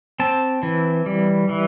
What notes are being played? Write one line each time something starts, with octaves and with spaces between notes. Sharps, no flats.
C4 A5
E3
G3
E3